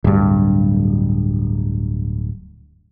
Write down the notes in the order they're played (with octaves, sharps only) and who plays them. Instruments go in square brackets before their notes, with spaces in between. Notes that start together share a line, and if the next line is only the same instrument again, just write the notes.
[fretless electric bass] D1 G2